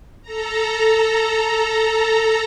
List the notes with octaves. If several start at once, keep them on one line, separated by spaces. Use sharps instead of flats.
A4 A#5